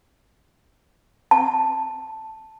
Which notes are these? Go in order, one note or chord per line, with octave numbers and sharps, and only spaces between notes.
A5